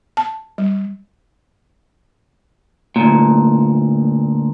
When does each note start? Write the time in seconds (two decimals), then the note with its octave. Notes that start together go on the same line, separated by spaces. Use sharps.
0.17 A5
0.58 G3
2.96 D2 A#2